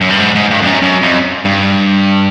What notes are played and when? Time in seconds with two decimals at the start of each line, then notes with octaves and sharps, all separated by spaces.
0.01 F#2
0.10 G2
0.20 G#2
0.35 G#2
0.51 G2
0.61 F2
0.66 F#2
0.82 F#2
1.02 F2
1.45 G2